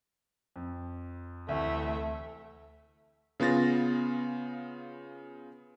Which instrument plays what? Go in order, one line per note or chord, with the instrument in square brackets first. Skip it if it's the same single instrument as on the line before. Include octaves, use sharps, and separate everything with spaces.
[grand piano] F2
[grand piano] D2 C3 E3 [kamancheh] A3 E5
[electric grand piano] C#3 B3 F4 A6 A#6